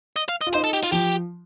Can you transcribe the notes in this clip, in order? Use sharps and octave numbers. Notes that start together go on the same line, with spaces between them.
D#5
F5
D#5
F4
D#4 C5
A4
G4
F4
F3 G4